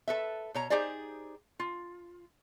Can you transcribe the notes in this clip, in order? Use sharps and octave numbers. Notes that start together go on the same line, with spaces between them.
A4 B4 E5
B2 C#5 A#5
D#4 G4 G#4 C5 D5
F4